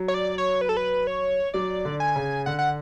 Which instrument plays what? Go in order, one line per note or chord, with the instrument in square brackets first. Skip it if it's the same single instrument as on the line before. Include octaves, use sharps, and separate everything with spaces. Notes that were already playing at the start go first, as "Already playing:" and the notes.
Already playing: [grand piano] F#3
[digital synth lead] C#5
D5
C#5
B4
A4
B4
C#5
[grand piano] F#3 [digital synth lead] D5
[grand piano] D3
[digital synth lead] G#5
[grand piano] C#3
[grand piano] D3 [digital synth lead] F#5
[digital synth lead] F#5